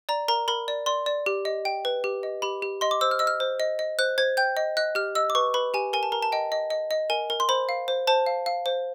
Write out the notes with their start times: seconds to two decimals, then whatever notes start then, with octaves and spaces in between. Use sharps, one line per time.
0.09 D5 A#5
0.28 A#4 A#5
0.48 A#4 B5
0.68 D5
0.86 D5 C6
1.06 D5
1.26 G4
1.45 D#5
1.65 G5
1.85 B4
2.04 G4
2.23 D#5
2.42 G4 B5
2.62 G4
2.81 D#5 C6
2.91 D6
3.01 C5 E6
3.11 F6
3.19 D#5 E6
3.27 F6
3.40 C5
3.60 D#5
3.79 D#5
3.99 C5 F#6
4.18 C5 G#6
4.37 G5 G6
4.57 D#5
4.77 D#5 F#6
4.95 G4 F6
5.15 D#5 E6
5.30 D6
5.35 B4 C#6
5.54 B4 B5
5.74 G4 G#5
5.93 A#4 G#5
6.03 A5
6.12 A#4 A#5
6.23 A5
6.32 D#5 G5
6.52 D#5
6.70 D#5
6.91 D#5
7.10 A#4 G#5
7.30 A#4
7.40 C6
7.49 C5 B5
7.69 F5
7.88 C5
8.07 C5 A5
8.26 F5
8.46 F5
8.66 C5